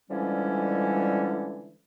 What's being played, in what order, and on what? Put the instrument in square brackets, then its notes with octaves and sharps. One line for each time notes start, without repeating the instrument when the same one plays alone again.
[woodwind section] D3 E3 F3 G3 G#3 C#4